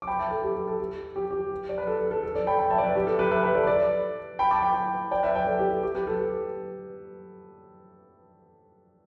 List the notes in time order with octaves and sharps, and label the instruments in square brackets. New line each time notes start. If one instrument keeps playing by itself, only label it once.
[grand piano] D6
G5 B5
E5 A5
A4
G4
A4
A4
G4
G4
G4
D5
B4
A4
A4
A4
A4
A4 D5
G5 B5
G5 B5
E5 A5
D5
B4 E5
G4
A4
G4 B4
B4 E5
B4 E5
A4 D5
B4
A4 D5
G5 B5
A5 D6
G5 B5
D5 G5
B4 E5
D5 G5
A4
G4
A4
G4
G4 B4
A4
G4